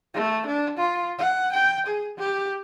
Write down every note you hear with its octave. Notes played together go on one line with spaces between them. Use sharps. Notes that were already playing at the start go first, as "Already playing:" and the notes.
A3
D4
F4
F#5
G5
G#4
G4